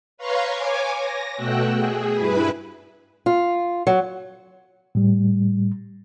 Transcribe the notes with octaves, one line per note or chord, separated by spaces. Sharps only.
B4 C#5 F5 A#5 C6 C#6
C#5 G#5 D6
A#6
B2 A3 F#4 G5 E6 F#6
G#4
G2 E4 B4 B5
F4
F#3
A2 G3